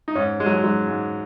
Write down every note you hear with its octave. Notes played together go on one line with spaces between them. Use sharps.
D#4
G#2 C#4
G#2 G#3
F#3
G#3
G#2 F#3
G#2